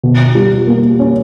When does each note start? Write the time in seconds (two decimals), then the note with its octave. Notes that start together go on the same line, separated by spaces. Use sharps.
0.03 B2
0.35 G3
0.67 A#3
0.99 C#4